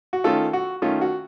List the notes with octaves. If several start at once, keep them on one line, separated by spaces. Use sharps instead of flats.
F#4
D#3 A3 C#4 F4 A4
F#4
D#3 A3 C#4 F4
F#4